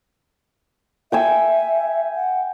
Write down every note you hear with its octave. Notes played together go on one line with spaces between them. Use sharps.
E5 G5 G#5 E6
F#5